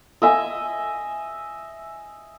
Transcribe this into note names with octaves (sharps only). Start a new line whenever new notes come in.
D#5 E5 G#5